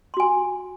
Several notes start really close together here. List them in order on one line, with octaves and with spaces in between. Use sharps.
C6 F#4 G#5